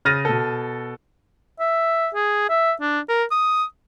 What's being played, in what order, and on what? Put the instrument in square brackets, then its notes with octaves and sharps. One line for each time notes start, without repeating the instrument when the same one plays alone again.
[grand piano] C#3 F6 A6 A#6 D#7
B2 A4
[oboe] E5
G#4
E5
D4
A#4
D#6